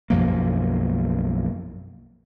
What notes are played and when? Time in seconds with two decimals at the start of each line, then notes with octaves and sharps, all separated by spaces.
0.10 B1 F#2 F3 A#3